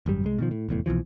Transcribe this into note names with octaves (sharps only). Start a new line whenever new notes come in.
G#1 F#2 G3
C2 G#3
B2 D#3 F3
A2
F1 E2 A2
C2 B2 E3 F3